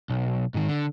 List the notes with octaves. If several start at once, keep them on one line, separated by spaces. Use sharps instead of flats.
B1
G#2 D#3
D3